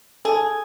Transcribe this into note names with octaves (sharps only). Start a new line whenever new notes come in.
G#4 A4